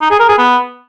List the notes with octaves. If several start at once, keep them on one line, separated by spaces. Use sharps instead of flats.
D#4
G#4
A#4
G#4
B3